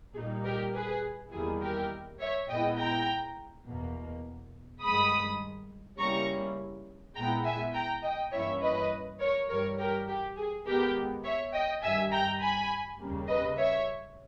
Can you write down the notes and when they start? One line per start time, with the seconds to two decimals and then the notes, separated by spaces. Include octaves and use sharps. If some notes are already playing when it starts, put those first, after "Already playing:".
0.16 A#2 G3 A#3 D#4 G#4
0.45 G4 A#4
0.74 G#4 B4
1.33 E2 D#3 G3 A#3 E4 G#4
1.62 G4 A#4
2.20 C#5 E5
2.49 A#2 G#3 B3 E4 D#5 G5
2.78 G5 A#5
3.66 E2 B2 A#3
4.83 G2 D#3 G#3 B5 D#6
5.99 C#3 G3 A#3 C#4 E4 A#5 C#6
7.16 A#2 G#3 B3 E4 G5 A#5
7.45 E5 G#5
7.74 G5 A#5
8.04 D#5 G5
8.33 G2 E3 A#3 C#4 E4 C#5 E5
8.62 B4 D#5
9.20 A#4 C#5
9.49 G2 E3 G3 A#4 C#5
9.78 G4 A#4
10.08 G4
10.37 G#4
10.66 D#2 D#3 G#3 B3 G4 A#4
11.24 C#5 E5
11.53 D#5 G5
11.83 G2 D#3 G3 E5 G#5
12.12 G5 A#5
12.41 G#5 B5
12.99 D#2 C#3 G3 A#3
13.28 B4 D#5
13.58 C#5 E5